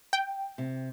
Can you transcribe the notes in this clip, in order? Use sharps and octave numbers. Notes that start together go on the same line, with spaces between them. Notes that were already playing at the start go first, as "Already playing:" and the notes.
G5
C3